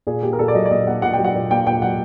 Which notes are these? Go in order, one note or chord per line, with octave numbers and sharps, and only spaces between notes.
A#2 G#4
A#3 G4
A#4
A#2 A4
D5
F#3 D#5
D5
A#2 D#5
A#3 F#5
A#2 F#5
G5
F#3
F#5
A#2
A#3 G5
A#2 G5
F#3 F#5